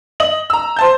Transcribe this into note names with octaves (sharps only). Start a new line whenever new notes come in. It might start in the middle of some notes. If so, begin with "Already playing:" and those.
D#5 F#7
A#5 E6
C5 A5 G6